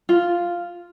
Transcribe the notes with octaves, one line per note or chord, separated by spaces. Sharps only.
F4